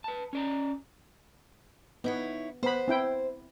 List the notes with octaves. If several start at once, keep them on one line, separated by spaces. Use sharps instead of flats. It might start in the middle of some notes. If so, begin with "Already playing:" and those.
B4 A5
C#4 D5 A#5
B3 D#4 E4 C#5
B3 C5 B5
C4 E4 G5